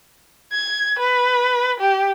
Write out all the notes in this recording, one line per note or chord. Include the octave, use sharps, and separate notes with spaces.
G#6
B4
G4